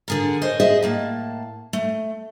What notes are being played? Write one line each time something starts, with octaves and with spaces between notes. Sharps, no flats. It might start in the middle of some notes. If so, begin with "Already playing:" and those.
D3 G#4 A#4
C5 C#5 D#5
G#4 C5 D#5 E5
A2 A#3 A5
A3